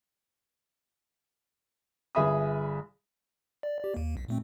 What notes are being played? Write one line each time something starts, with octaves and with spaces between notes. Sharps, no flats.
G1 G#4 E5 B5 D#6
D5
G4 D5
D#2 A#3
B1
A#2 A3 C4